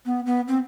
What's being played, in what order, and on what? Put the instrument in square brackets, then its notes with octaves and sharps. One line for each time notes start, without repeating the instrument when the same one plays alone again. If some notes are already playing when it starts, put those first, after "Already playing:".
[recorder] B3
B3
C4